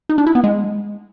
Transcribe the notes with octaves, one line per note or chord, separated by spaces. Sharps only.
D#4
D4
E4
B3
G#3